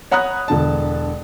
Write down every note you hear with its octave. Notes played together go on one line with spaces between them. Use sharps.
C#5 F#5 A#5 B5 D#6 F#6
E1 D3 A5